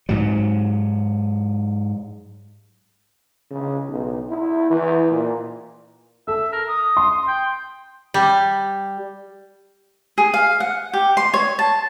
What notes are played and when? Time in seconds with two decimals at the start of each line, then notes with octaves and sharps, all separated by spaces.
0.09 G#2 F#3
3.50 C#3
3.89 B1
4.29 E4
4.70 E3
5.11 A#2
6.28 A4 E5
6.52 A#4
6.69 D#6
6.97 C6
7.27 G5
8.14 G3
10.18 G#4
10.34 F5
10.60 F#5
10.93 G4
11.17 C6
11.34 C#5
11.59 A5